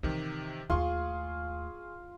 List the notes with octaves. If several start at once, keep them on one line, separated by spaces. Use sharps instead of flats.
C3 D#3 E3 C4 G4
D#2 A3 F4 G#4 C6 C#6